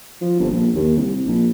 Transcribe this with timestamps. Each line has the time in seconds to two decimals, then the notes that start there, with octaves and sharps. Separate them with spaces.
0.21 F3
0.39 G1
0.51 A#1
0.74 D#2
0.96 C2
1.26 A#1